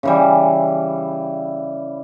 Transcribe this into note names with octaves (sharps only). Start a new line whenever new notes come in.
C#3 E3 G3